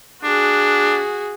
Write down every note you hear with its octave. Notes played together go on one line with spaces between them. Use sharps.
D4 F#4 G#4